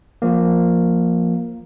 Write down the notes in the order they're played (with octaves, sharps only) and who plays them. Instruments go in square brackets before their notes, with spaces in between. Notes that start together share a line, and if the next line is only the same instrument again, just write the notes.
[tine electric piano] F3 A#3